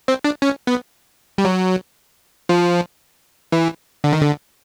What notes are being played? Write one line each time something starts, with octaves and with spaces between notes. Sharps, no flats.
C4
D4
C#4
B3
G3
F#3
F3
E3
D3
D#3
D3